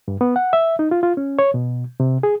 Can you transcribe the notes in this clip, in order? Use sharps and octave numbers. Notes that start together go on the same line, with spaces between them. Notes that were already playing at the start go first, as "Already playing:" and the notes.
G2
B3
F#5
E5
D#4
F4
F4
C#4
C#5
B2
C3
G#4